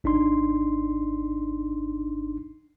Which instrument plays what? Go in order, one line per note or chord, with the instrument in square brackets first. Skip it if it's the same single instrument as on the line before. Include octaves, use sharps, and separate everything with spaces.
[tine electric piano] G#1 D4 D#4 C6